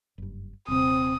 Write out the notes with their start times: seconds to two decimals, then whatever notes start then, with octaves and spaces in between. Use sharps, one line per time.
0.18 F#1 G2
0.68 D#1 C3 C4 D#6